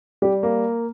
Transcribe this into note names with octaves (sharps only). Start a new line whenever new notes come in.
G3 G4
A#3